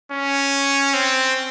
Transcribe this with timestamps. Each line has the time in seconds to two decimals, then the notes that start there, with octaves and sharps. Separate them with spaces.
0.12 C#4
0.94 C4